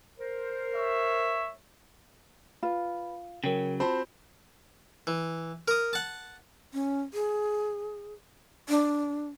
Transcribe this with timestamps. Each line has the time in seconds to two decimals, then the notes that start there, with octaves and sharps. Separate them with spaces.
0.19 A#4 C5
0.75 C#5 E5
2.63 F4 B4 B5
3.44 C#3 F#3 A#4 C#5 G5
3.80 C4 F4 F#4 C5 A5 B5
5.07 E3
5.68 A#4 D#6
5.93 F#5 A5
6.73 C#4
7.14 G#4
8.69 D4